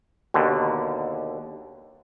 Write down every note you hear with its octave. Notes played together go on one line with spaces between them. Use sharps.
D#2 B2 D3